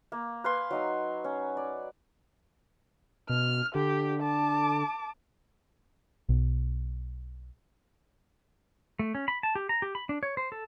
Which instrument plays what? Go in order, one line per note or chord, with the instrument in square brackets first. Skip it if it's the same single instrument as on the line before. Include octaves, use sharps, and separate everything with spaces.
[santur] A#3
B4 F5 G#5 C6
F#3 D#4 G#5
C#4
D5
[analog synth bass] B2 [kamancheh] F6
[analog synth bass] D3 [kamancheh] G4
[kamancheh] A5 D6
[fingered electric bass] B1
[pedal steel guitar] A3
C#4
B5
A5
G4
A#5
G4
B5
D4
C#5
C5
A4